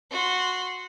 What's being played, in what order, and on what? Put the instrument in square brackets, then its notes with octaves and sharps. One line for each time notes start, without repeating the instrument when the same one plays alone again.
[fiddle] F#4 C6